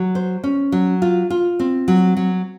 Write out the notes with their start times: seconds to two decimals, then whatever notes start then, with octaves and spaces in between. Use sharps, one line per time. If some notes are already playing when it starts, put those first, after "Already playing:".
Already playing: F#3
0.15 C5
0.44 C#4
0.72 F#3
1.02 F4
1.30 F4
1.59 C4
1.88 F#3
2.17 F#3